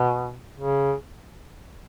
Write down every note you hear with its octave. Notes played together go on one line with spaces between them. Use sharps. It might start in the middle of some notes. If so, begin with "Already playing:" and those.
Already playing: B2
C#3